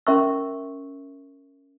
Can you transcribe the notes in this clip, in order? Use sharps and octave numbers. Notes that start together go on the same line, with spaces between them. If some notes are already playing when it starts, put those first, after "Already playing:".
C#4 A#4 E5 C6 C#6 E6